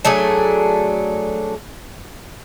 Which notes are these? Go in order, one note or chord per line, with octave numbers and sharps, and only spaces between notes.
F#3 A3 D4 G#4